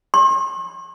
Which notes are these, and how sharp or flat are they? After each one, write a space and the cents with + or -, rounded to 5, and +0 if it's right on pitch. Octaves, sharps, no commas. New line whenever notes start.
C6 +45